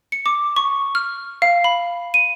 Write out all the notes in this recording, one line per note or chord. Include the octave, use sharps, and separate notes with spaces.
C#7
D6
C#6
F6
F5
B5
D#7